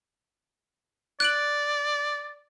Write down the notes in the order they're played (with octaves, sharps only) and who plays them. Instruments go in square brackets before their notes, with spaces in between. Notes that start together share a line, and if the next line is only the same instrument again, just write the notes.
[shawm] D5 [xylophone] F#6 D7 F#7